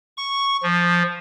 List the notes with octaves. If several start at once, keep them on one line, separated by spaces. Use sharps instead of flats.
C#6
F3